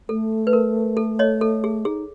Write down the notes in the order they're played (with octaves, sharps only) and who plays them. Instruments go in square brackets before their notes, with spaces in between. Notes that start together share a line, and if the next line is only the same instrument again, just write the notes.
[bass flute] A3 [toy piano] A4
[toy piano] B4
A#4
A4
C#5 D#5
A4
G#4
[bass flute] D#4 [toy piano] G#4